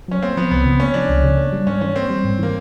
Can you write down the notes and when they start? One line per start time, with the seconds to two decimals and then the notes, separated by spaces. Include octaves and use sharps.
0.08 F#3 C#4
0.22 A#3 C4
0.37 F3 B3
0.51 C#2 B3
0.65 C#3
0.80 A#3 C#4
0.94 F3 D4
1.09 C#2
1.24 C#3
1.37 A#3
1.52 G3
1.66 G#2 C#4
1.81 E3 C#4
1.96 A#3 C4
2.10 G3
2.24 G#2
2.39 E3 A#3